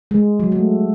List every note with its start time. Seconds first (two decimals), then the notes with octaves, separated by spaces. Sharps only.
0.11 G#3
0.40 F#3
0.52 A3